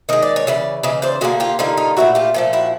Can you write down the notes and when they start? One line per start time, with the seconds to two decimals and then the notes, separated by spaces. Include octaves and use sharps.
0.09 D#3 G#3 D#5
0.22 D5
0.36 C#5
0.47 C#3 E3 D5
0.83 C#3 E3 D#5
1.02 C5 D5
1.21 D3 G3 A#3 F#4 G#4
1.40 F4 G4
1.59 D3 G3 A#3 D#4 F4
1.77 D#4 F4
1.97 A#2 F3 A3 E4 F#4
2.15 F4 G4
2.34 A#2 F3 A3
2.53 E4 F#4